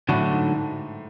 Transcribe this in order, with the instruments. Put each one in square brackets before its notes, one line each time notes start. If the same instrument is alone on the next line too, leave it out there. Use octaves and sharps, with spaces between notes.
[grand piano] A2 [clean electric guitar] D3 F#3 A3 D4 F#4
[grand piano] G#2